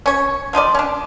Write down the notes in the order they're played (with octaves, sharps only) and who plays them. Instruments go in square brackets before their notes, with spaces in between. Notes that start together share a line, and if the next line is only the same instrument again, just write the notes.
[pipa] C#4 C#5
F3 D#4 F4 D5
C#4 D4